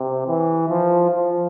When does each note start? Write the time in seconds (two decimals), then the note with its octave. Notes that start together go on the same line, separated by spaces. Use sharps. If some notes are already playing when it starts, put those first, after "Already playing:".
Already playing: C3
0.27 E3
0.69 F3
1.10 F3